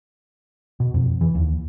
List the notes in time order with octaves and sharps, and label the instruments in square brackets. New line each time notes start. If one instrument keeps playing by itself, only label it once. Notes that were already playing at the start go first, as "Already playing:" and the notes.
[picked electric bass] B2
F2
E3
D#2